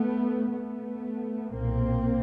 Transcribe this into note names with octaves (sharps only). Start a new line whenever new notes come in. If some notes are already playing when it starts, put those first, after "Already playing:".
Already playing: A3 B3
A3 B3
B1 A#2 A#3 C4